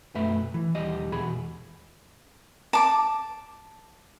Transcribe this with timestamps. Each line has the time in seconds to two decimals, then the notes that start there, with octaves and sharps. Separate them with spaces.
0.15 B1 F#2 A3 B4 E5
0.54 E3
0.75 D#2 G3 D#5
1.12 E2 B2 G#4 B5
2.73 A5 D6